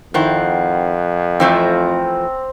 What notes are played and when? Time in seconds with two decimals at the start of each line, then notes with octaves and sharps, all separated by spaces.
0.14 F2 D#3 C4 E4 F#5
1.40 E3 F3 A3 C4 A#5